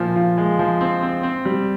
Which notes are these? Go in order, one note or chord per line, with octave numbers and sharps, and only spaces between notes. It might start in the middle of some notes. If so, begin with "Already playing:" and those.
Already playing: A#2 F3
F3
G#3
F3
C4
C4
C4
G3